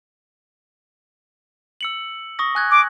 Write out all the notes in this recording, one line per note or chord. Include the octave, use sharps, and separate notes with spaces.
E6 C#7 F#7
C#6 D#6 A#6
G#5 F#6 G#6
D6